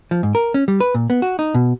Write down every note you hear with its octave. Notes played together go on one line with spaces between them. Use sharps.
F3
G#2
A#4
C#4
G3
B4
A#2
B3
F#4
D#4
B2